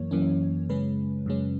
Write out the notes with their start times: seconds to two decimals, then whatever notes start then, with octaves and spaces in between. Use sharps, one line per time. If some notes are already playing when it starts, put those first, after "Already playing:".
Already playing: F#2 E3 A#3 C#5
0.11 F#2 E3 A#3 C#4
0.69 F#2 C#3 G#3 C#4 B4
1.26 F#2 C#3 G#3 C#4